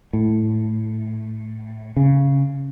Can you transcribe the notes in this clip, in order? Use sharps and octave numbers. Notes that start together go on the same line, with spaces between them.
A2
C#3